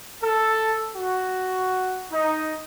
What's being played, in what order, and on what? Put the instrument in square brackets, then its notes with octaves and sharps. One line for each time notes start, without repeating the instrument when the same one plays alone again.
[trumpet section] A4
F#4
D#4